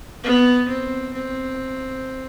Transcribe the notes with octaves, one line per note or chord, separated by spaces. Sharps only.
B3
C4
C4